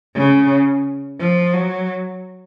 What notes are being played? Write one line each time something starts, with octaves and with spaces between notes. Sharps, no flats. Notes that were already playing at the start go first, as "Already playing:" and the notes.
C#3
F3
F#3